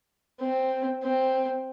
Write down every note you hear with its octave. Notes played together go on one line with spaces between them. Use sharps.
C4
C4